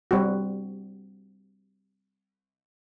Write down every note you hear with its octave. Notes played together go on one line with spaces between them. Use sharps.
G3 C4 F#4